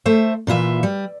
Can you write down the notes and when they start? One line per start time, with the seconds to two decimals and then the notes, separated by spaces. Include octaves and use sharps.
0.06 A3 C5 E5
0.47 A#2 E3 F4 E5
0.83 G3